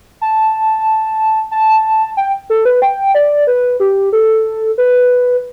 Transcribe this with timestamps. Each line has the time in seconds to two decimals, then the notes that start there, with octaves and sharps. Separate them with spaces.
0.21 A5
1.51 A5
2.17 G5
2.50 A4
2.65 B4
2.82 G5
3.15 D5
3.47 B4
3.80 G4
4.13 A4
4.78 B4